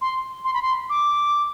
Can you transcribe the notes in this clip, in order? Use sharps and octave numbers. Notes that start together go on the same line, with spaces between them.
C6
C6
B5
C6
D6